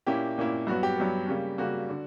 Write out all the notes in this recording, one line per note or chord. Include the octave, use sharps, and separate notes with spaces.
A#2 A#3 C#4 E4 G4
A#2 A#3 C#4 E4
G2 F#3 B3 F#4
G4
G2 F#3 B3
C#3 G3 A#3 C#4
C#3 G3 A#3 C#4 F#4
D3